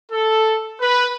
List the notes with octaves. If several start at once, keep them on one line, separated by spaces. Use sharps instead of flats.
A4
B4